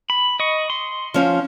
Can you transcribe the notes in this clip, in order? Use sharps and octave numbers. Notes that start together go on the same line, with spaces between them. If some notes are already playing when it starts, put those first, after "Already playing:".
B5
D#5 C#6
C6
F3 C#4 F4